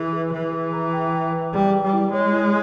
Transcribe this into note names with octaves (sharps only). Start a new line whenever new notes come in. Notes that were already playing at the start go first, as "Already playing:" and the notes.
Already playing: E3 G#4 B4
G#4
E3 G#4
G#4
A#5
G5
G5
B4
G3 G#4
G5
G3
E4
G#3 C#5
E4